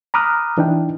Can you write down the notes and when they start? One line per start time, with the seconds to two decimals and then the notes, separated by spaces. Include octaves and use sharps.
0.14 A#5 B5 D6 D#6 F6 F#6
0.58 E3 D4 D#4 G5